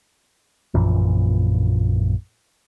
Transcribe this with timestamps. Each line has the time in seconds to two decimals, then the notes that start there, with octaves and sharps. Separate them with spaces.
0.74 A#1 F#2 A#2 E3